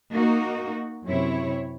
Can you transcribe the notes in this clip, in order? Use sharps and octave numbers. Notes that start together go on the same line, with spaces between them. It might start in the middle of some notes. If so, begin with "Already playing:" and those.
A#3 D#4 F#4
F#2 C3 E4 C#5